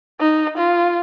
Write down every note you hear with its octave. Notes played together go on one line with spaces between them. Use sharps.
D#4
F4